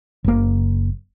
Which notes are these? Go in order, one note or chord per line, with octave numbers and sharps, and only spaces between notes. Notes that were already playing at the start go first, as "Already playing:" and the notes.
F#1 A#3